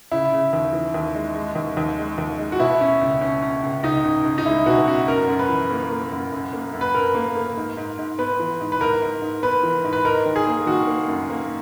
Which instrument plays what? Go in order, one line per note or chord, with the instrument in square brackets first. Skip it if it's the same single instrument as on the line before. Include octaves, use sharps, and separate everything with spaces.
[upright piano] C#3 [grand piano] E4
[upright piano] C#3
D#2
E3
D#2
G#3
G#3
D#2
D#2
G#3
D#2
G#3
[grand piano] F#4
[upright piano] B2 [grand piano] E4
[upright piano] C#4
C#2
C#4
C#4
C#2
[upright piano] C#2 [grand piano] D#4
[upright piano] C#2
C#2
[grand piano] D#4
[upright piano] G#3 [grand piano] E4
[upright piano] B2 [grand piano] F#4
[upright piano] C#4 [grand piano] F#4
[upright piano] F#2 [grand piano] A#4
[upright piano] F#2
[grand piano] B4
[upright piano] E3
A#3
A#3
F#2
F#2
A#3
F#2
[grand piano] B4
[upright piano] F#2 [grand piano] A#4
[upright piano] A#3
A#3
G#2
G#2
G#2
[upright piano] B3 [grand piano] B4
[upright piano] E3
G#2
[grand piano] B4
[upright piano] G#2 [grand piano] A#4
[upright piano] G#2
G#2
[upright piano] B3 [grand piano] B4
[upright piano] E3
G#2
[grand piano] B4
[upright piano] D#4 [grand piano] A#4
[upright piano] D#3
[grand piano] G#4
[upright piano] A#3
[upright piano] D#3 [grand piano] F#4
[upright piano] A#3
F#2
A#3